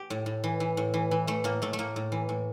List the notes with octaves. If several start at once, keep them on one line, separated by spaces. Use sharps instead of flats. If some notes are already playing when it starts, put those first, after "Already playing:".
Already playing: G4
A2
A2
E3
E3
A2
E3
E3
E3 A3
A2 A#3
A2 A3
A3
A2 A#3
A2
E3
A2